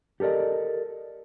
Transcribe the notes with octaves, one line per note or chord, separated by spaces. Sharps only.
G4 A4 A#4 D5 D#5